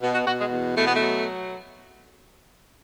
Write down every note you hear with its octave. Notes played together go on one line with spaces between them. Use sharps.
B2
F#4
B2 F#4
G#3
E2
B2 A3
B3
A3
F#3